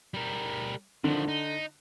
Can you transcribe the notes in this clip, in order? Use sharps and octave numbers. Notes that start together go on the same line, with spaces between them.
G3 A#4
D3 D#3 F3
D#4